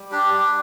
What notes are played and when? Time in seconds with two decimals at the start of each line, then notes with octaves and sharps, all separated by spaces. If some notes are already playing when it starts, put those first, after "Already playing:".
Already playing: G3
0.11 D4 G4
0.34 G3 G4